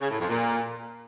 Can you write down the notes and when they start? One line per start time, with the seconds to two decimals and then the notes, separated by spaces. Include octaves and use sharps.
0.01 C#3
0.10 A2
0.20 F2
0.29 A#2